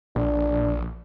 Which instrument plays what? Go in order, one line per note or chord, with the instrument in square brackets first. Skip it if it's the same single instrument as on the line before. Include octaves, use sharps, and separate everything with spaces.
[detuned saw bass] A#1 [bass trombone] D4